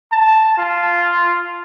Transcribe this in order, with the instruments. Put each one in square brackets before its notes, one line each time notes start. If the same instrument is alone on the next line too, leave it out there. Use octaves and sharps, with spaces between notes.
[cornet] A5
F4